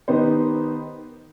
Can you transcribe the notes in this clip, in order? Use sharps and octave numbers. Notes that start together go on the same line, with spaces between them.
D#3 B3 D#4 G4 C5